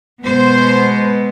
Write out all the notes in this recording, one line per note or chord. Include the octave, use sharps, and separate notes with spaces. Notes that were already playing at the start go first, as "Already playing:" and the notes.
B2 G#3 B3 C5